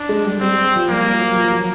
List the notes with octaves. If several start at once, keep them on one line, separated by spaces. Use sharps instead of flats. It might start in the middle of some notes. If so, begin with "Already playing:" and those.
Already playing: D4
G#3
G3
G3 C4
G3
F3
G3 A#3
G3
F#3
F3
F#3